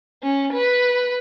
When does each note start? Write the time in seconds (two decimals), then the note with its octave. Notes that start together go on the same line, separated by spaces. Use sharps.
0.23 C#4
0.53 B4